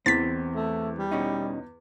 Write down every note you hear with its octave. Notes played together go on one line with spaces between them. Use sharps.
E2 E3 C4 A6 B6
A3
G3
B2 C#4 D#4